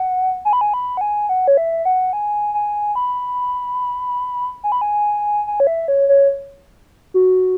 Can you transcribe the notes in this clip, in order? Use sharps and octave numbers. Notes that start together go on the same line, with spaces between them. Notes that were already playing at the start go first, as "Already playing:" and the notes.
Already playing: F#5
G#5
B5
G#5
B5
F#5
G#5
F#5
C#5
E5
F#5
G#5
G#5
B5
G#5
B5
G#5
G#5
C#5
E5
C#5
C#5
F#4